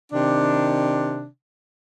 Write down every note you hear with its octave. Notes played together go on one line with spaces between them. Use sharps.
C3 D#3 D4